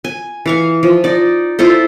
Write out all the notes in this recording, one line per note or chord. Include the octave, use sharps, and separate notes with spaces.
G#5
E3 F5 C#6
F3
D#4 D5
E4 F4 A4 C5